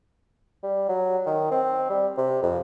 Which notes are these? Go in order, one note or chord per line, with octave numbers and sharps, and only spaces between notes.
G3
F#3
D#3
C4
G3
C3
F2